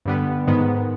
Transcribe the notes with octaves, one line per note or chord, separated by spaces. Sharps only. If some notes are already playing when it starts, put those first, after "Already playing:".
G2 D3 G3 B3
G#2 D#3 G#3 B3